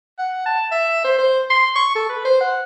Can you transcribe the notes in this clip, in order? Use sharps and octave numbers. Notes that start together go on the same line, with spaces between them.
F#5
A5
E5
C5
C5
C6
C#6
A4
B4
C5
F#5